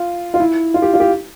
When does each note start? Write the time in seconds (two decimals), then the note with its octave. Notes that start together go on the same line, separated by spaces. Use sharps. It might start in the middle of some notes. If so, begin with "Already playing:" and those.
Already playing: F4
0.34 F4
0.40 E4
0.74 F4
0.82 G4
0.94 F4
1.00 G4